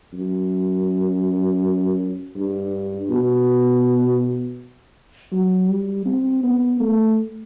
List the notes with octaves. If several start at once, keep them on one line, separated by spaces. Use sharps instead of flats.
F#2
G2
B2
F#3
G3
C4
B3
A3